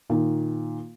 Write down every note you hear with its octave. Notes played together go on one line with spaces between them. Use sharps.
A#2 D#3